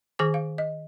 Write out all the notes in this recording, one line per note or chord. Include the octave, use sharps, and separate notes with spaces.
D#3 G#4 C5 G#5 D6
F5
D#5